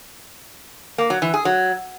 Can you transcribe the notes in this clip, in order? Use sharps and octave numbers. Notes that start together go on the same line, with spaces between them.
A#3
F#3
E3
G#4
F#3